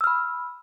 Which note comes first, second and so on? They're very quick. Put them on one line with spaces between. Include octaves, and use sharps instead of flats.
E6 F6 B5